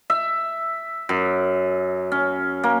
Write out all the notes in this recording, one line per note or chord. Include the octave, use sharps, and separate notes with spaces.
E5
F#2
C#4
A#3